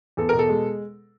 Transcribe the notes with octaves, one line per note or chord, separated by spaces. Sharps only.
E2 A4
B2 A#4
A4
G#3